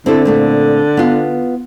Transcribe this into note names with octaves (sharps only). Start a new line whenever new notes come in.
D3 C4 E4 A4
A#2 A3 C4
B3 F4